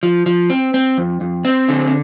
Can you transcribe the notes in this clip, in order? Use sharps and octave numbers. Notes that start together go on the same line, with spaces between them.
F3
F3
C4
C4
F2
F2
C4
D3